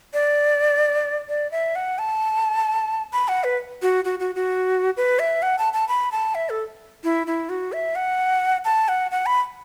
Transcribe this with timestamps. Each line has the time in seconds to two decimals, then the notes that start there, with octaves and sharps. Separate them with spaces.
0.14 D5
1.29 D5
1.52 E5
1.76 F#5
1.99 A5
3.13 B5
3.28 F#5
3.44 B4
3.82 F#4
4.05 F#4
4.20 F#4
4.35 F#4
4.97 B4
5.19 E5
5.42 F#5
5.59 A5
5.74 A5
5.88 B5
6.12 A5
6.35 E5
6.50 A4
7.04 E4
7.27 E4
7.49 F#4
7.73 E5
7.95 F#5
8.65 A5
8.88 F#5
9.11 F#5
9.26 B5